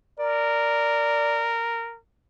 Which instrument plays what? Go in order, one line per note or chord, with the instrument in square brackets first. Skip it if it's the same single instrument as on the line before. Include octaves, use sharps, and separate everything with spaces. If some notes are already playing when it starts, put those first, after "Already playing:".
[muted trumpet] A#4 [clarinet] D5